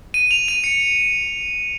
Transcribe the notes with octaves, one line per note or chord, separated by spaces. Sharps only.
D#7
F7
D#7
C#7